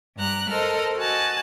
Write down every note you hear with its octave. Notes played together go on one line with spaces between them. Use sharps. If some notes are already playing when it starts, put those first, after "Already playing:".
G2 G3 A#5 F#6
A4 A#4 C5 D#5 F6
F#4 D#5 G#5 A5 F#6